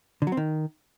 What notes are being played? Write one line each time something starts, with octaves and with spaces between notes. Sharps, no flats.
D3
F#3
C4
D#3